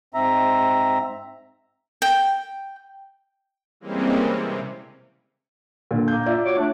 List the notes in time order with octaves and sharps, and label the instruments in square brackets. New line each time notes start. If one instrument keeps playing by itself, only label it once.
[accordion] G#2 C4 E5 A#5
[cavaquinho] G5
[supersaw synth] E3 G3 G#3 A#3 C4 C#4
C3
[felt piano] A#2 D3
[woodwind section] A#3 [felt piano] G6
[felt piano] F4 D5 E5
[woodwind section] F#4 C#5 D6
A3 D4